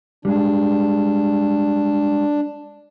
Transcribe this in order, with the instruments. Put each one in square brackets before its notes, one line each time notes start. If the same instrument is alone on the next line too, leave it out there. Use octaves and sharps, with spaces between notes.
[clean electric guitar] G3 G#3 G#4 [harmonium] D4